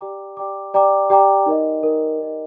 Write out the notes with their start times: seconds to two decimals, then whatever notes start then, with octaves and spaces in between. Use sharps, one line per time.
0.01 G4 D5 G5 A#5 D6
0.37 G4 D5 G5 A#5 D6
0.74 G4 D5 G5 A#5 D6
1.10 G4 D5 G5 A#5 D6
1.46 D#4 A#4 D#5
1.83 D#4 A#4 D#5
2.19 D#4 A#4 D#5